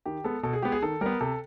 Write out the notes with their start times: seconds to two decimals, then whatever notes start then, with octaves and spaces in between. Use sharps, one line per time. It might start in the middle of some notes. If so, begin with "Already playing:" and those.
0.06 D#3 G4
0.24 G#3 B3 A4
0.43 B2 A4
0.53 G#4
0.62 G#3 B3 G4
0.72 G#4
0.82 D#3 A4
1.01 G3 B3 A#4
1.21 C3 A4